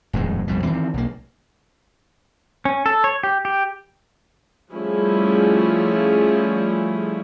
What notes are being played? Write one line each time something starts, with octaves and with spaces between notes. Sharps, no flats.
D#1 F2 A2 G#3
A#1 F2 B2 G3
D#3 E3 G#3 C4
B1 A#3
C#4
A4
C#5
G4
G4
F3 G3 A3 C#4 E4 G#4